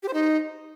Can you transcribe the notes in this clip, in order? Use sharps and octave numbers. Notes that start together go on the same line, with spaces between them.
G4
C5
D#4